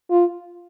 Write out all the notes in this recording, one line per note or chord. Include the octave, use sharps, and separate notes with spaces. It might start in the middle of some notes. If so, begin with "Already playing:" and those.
F4